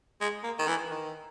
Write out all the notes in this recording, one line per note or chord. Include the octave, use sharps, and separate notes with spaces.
G#3
A#3
D#3
E3
D#3